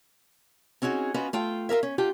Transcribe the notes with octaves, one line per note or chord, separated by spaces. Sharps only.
C4 C#4 D#4 F#4 G#4
C#4 F4 F#4 B4 D#5
A3 F4 G5
F4 G#4 A#4 E5
C#4
D4 F4 G4 G5